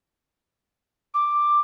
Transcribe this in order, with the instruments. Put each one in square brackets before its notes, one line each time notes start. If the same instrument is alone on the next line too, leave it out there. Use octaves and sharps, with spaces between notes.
[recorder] D6